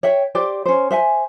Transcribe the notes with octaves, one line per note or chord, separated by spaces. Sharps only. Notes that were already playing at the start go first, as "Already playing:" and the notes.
C#5 E5 G5
G4 C5 D5
C#4 C5
C5 E5 F#5 G#5